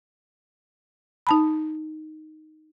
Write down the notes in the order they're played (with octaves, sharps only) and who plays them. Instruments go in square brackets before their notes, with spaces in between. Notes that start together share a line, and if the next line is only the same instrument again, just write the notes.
[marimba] D#4 A5 B5